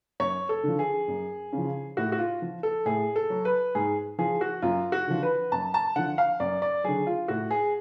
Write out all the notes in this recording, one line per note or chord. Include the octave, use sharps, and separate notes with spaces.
F#2 C#5
A4
D3 F3
G#4
F#2
C#3
F3
A2 F#4
F#4
F4
F3
A4
A2 G#4
A4
F#3
B4
G#2 G#4
F3 G#4
F#4
F#2 F4
F#4
D3 F3
B4
F#2 A5
A5
D3 F3 F#5
F5
F#2 D5
D5
D3 F#3 G#4
F4
A2 F#4
G#4